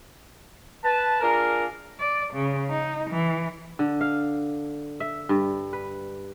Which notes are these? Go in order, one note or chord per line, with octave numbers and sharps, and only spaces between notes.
B4 A5
A#3 D4 F4 G#4 A#4
D5
C#3
D#4
E3
D3
F5
E5
G2
B4